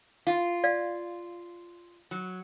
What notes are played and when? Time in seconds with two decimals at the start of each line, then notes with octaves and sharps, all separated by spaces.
0.27 F4
0.64 D5 F5
2.11 F#3